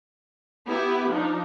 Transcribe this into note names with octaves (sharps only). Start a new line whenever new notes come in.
B3 E4 G4 B4
F3 D4 D#4